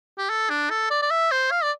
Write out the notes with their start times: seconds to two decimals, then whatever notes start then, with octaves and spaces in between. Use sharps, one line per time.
0.18 G4
0.29 A4
0.50 D4
0.70 A4
0.90 D5
1.02 D5
1.11 E5
1.31 C5
1.51 F5
1.63 D5